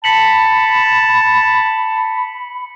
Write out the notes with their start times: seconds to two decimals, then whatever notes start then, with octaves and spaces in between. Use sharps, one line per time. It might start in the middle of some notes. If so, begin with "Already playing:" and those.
0.04 A5 B5 B6 C#7 F#7